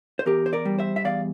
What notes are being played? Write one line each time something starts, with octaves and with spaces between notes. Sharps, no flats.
C5
E2 G4 A#4
C5
A#4 D5
G3
C5 E5
E5
E2 D5 F5